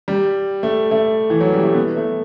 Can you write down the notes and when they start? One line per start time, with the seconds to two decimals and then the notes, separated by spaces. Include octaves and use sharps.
0.08 G3
0.63 A3
0.91 A3
1.30 E3
1.41 F#3
1.53 G3
1.63 A3
1.75 B3
1.96 A3